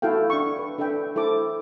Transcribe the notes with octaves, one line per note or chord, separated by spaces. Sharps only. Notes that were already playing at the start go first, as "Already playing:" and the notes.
E4 F#4 A4 F5 G5
D4 C#6
B4
D4 A4 B4 E5 G5
E4 A4 C5 D6